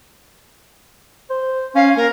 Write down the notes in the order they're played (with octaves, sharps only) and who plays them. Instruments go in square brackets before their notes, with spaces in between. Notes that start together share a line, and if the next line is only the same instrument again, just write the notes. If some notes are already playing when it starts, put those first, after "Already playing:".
[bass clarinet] C5
[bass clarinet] C#4 [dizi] F5
[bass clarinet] A#3 [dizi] A#4